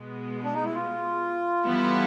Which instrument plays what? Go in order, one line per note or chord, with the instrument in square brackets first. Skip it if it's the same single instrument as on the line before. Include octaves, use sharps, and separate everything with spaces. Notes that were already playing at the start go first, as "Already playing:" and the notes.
Already playing: [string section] B2 G#3 B3
[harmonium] D4
D#4
E4
F4
[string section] E3 G3 B3 E4 A4